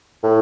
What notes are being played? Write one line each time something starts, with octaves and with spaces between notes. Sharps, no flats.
A2